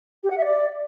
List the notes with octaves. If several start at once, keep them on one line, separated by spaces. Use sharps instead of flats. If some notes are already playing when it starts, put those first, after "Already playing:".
G4
F#5
E5
D5